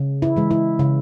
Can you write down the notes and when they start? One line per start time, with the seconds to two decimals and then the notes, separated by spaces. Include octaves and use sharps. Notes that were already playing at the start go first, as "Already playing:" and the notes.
Already playing: C#3
0.22 E4
0.36 E3 G#3
0.51 E4
0.79 C#3